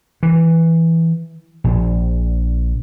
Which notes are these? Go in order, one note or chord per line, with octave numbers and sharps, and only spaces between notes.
E3
A#1